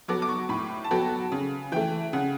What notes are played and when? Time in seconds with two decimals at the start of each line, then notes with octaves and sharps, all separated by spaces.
0.08 F#3 B3 F#4 A4 D6
0.22 D6
0.29 C#6
0.49 A2 B5
0.84 A5
0.91 F#3 B3 F#4 A4 G5
1.32 C#3
1.72 E3 A3 G5
2.13 C#3 F#5